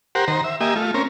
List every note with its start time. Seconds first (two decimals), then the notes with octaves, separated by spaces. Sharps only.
0.15 G4 A#4 C5 F#5
0.28 D#3 C5 A#5
0.44 E5
0.61 A#3 G4 D#5 E5 G#5
0.76 A3 F4
0.94 C4 C#4 A#4